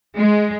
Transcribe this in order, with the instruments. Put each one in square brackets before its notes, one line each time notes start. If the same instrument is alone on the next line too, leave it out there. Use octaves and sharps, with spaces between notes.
[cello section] G#3